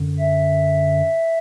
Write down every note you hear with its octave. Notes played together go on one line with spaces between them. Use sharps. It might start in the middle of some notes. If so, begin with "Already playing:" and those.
Already playing: F#2 D3
E5